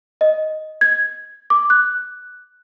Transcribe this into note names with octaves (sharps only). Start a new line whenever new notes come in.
D#5
G#6
D6
F#6